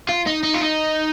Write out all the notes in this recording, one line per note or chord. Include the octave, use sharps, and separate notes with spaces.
F4
D#4
D#4
F4
D#4